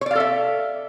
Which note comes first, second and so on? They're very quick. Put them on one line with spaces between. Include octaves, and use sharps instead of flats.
C#5 D5 F5 A4 E5